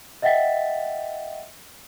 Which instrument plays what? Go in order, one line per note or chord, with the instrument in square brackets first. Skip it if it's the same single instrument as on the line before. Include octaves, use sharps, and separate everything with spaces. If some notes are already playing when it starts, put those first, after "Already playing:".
[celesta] D#5 E5 F#5 G5 A6 B6